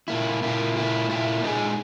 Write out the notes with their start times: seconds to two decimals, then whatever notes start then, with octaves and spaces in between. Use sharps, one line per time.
0.08 A#2 A#3 E4
0.42 A#2 A#3 E4
0.75 A#2 A#3 E4
1.09 A#2 A#3 E4
1.42 A#2 G#3 D#4 G#4